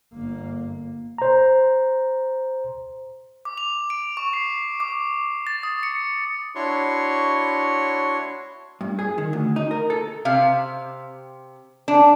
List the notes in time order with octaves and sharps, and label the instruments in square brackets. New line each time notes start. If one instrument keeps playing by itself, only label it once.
[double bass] G1 A#3
[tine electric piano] C5 A#5
[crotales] D6
F7
D7
C#6
C7
D6
A6
D#6
C#7
[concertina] D4 E4 F#4 C#5 C6 C#6
[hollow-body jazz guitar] G2
G#4
D#3
D2
D#4
A#4
A4
[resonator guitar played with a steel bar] C3 F5
D4